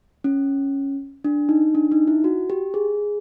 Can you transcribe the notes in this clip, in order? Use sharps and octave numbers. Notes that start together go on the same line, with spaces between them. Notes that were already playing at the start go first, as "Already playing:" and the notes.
C#4
D4
D#4
D4
D#4
E4
F#4
G4
G#4